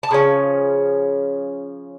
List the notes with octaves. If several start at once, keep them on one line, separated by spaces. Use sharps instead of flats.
A5
C#3 F3 C#4